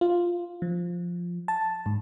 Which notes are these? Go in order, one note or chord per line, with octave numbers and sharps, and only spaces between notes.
F4
F3
A5
G#2